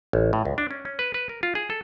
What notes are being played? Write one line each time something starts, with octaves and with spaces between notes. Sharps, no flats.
A1
A2
C#2
D4
C#4
C#4
B4
B4
A#4
F4
G#4
A4